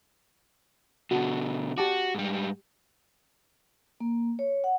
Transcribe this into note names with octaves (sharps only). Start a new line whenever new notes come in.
B2 D3 F#4 A5
F#4 G4 A5 D6
G#2 G3
A#3
C#5
F#5